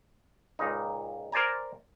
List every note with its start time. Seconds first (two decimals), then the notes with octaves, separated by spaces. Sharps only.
0.59 C#2 A#2 D#4
1.32 A#4 C5 D5 G#5 A#5